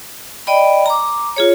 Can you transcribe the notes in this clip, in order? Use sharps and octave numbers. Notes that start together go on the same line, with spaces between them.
D5 D#5 G5 B5
A#5 D6
F4 G#4 C#5